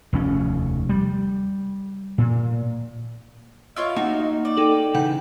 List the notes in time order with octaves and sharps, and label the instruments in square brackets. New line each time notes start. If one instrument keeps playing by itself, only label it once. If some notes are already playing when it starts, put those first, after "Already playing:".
[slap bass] F1 D#2 C#4
G3
A#2
[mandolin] E4 F4 C#5 [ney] D#5 [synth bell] F6
[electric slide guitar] A#3 D#4 [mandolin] F#4
[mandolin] D5
[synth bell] D#4 A4 F#7 [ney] G5
[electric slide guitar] C#3 E3 D#4 [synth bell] F#5 [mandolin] G6